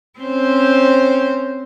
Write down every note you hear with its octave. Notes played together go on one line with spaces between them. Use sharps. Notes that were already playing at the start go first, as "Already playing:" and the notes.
C4 C#4 C5